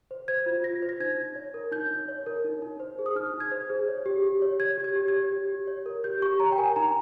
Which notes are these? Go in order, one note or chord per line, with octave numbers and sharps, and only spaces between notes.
C5
C5 G#6
F4
F4 A#6
C5
A#6
D#4 G#6
D#4
C#5
A#4
D#4 G6
D#4
C#5
A#4
D#4
D#4
C5
G#4
D#6
D#4 F6
D#4
G#6
C5
G#4
C#5
G4
G4
C#5
C#5 G#6
G4
G#6
G4
G#6
C#5
G4
G4
C#5
A#4
G4 G6
G4 C#6
C#5 A#5
G5
A#4 G#5
D#4 A#5